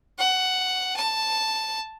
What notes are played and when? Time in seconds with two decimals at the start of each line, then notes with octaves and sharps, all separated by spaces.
0.18 F#5
0.96 A5